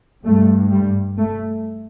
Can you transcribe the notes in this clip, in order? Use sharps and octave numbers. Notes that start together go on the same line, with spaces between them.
G2 A3
G3
A3